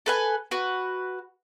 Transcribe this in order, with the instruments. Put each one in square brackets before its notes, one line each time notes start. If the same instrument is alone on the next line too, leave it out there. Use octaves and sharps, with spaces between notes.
[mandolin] A4 B4 G#5
F#4 B4